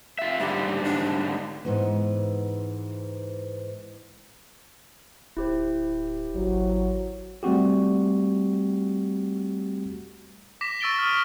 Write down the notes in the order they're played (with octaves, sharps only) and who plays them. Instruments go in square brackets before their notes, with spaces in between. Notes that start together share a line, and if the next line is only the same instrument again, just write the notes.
[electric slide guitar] F4 E5
[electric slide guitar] G#2 D3 G3 [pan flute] G4
[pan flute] D4
[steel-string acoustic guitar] G#2 E3 B3
[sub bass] D1 [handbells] E4 G4 C5
[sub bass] G#1 [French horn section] F#3
[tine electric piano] G3 A3 C4 F#4 G4
[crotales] D6 A#6 B6 E7
C#6 E6 A6 D7 G7
D#6 F6